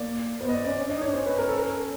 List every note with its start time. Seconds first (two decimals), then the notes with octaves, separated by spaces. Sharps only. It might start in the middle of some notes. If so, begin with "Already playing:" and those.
Already playing: A#3 D5
0.41 B3 C5
0.49 D#5
0.53 D5
0.65 C#4 D5
0.77 C#4
0.87 D4 D#5
0.96 D#4
1.01 D4 C#5
1.14 C#4 C5
1.26 B4
1.38 A#4
1.48 A4
1.58 A#4